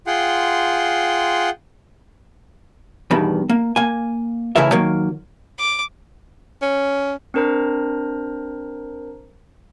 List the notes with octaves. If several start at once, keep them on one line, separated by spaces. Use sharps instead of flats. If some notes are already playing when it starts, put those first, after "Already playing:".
F4 G#4 F#5 G5 C6
E2 G2 B2 D#3 B5
A#3
A#3 G#5
A2 C#3 E3 E4 A#4 E5
D#3 F#3 A#3
D6
C#4
C4 D4 A#4 C5 A#5